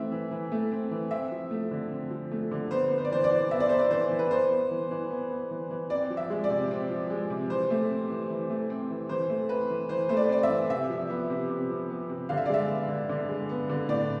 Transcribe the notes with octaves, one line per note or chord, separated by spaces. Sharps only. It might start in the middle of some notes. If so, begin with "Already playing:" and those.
Already playing: E3 A3 C4 E5
E3
E3
A3
C4
E3
C4 E5
F3
A3
D3
C4
F3
A3
D3
B3 C5
B3
C5
D5
E3 C5
D5
E3
B3 E5
D5
B3 C5
D5
E3 C5
E3
B4
B3 C5
B3
E3
E3
B3
B3
E3
E3
C4 D5
F3
E5
G#3
D5
C3
C4
F3
G#3
C3
E3 C5
A3
C4
E3
E3
A3
C4
E3
E3 C5
A3
C4 B4
E3
E3 C5
A3 C5
D5
C4 D5
E5
E3
C3 E5
F3
B3
C3
C3
F3
B3
C3
D3 F5
E5
D5
G#3 E5
B3
D3
D3
G#3
B3
D3
A2 D5